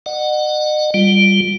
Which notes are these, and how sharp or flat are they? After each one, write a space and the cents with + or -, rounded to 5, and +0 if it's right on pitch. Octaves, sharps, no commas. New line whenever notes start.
D#5 -40 F#5 +0
G3 +0 F4 +15